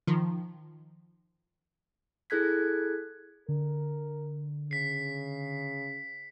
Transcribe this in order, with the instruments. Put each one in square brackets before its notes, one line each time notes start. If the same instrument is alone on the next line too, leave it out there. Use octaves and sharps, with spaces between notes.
[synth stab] D#3 F3
[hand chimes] E4 G#4 A4 F#6 G#6 B6
[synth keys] D3 [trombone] A#4
[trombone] C#3 [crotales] B6 C7